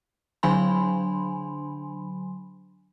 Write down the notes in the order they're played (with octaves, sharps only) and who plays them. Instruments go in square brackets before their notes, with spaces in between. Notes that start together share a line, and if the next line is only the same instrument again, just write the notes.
[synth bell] D3 F#3 D4 G#5 B5 C6